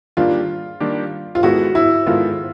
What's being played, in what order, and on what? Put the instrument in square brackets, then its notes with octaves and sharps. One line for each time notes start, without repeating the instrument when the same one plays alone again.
[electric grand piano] D#3 G3 A#3 D4 G4 [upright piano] F4
[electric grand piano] D#3 G3 A#3 D4 G4
[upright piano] F4
[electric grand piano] D#3 G#3 B3 E4 A4 [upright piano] F#4
[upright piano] E4
[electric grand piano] D#3 G#3 B3 E4 A4 [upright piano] F4